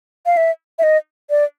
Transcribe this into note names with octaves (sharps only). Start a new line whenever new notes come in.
F5
E5
E5
D#5
D5